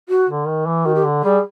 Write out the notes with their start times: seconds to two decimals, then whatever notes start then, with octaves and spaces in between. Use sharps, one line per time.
0.09 F#4
0.29 D3
0.48 D#3
0.66 E3
0.85 D#3 F#4
0.95 G4
1.05 D3
1.23 G3 G#4